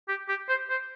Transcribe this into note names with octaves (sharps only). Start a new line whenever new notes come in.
G4
G4
C5
C5